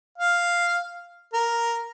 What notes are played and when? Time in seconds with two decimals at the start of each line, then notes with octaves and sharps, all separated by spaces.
0.18 F5
1.33 A#4